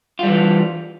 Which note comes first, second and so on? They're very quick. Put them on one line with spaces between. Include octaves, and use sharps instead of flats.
F4 G3 E3